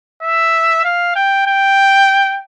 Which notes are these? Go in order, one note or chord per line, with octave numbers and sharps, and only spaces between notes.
E5
F5
G5
G5